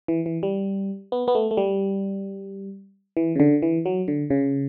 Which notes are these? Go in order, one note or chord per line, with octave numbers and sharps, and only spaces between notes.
E3
E3
G3
B3
B3
A3
A3
G3
E3
C#3
D3
E3
F#3
D3
C#3